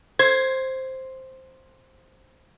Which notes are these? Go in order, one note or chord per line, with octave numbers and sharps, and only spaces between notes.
C5 G#6